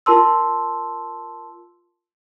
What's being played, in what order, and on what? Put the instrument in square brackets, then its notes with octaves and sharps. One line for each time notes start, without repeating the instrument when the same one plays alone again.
[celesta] F4 A#4 A5 C6 E6